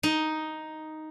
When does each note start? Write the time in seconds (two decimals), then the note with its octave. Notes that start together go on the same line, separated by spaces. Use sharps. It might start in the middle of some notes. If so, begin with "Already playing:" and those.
0.03 D#4